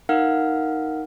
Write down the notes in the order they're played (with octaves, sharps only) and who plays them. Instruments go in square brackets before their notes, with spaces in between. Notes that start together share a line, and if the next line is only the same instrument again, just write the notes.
[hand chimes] D#4 A#4 F5 F#5 F6